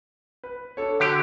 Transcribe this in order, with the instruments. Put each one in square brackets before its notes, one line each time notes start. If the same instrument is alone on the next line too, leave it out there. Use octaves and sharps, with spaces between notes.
[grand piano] B4
D4 A4 C#5
[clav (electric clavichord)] D3 G4 [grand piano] F#4 F#6